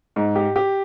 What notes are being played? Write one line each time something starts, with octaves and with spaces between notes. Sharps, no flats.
G#2
G4
G4